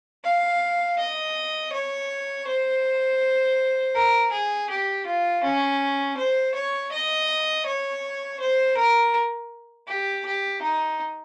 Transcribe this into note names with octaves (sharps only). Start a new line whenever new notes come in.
F5
D#5
C#5
C5
A#4
G#4
G4
F4
C#4
C5
C#5
D#5
C#5
C5
A#4
G4
G4
D#4